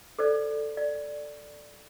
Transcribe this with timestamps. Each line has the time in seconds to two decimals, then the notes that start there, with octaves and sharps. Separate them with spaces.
0.19 A4 C5 D5
0.77 D5